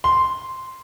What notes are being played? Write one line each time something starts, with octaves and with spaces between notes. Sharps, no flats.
C6